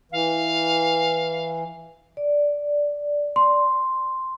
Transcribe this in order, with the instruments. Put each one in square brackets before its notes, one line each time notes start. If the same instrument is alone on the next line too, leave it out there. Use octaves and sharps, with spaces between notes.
[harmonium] E3 [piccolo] F5
[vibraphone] D5
[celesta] C6